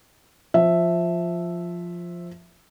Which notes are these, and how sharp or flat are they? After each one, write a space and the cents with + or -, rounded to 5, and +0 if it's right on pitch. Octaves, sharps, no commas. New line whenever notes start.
F3 +0 E5 +0